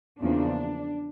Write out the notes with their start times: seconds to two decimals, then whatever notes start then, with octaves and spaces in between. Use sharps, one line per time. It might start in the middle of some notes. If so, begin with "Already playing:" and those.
0.19 E2 C#3 F3 A#3 D4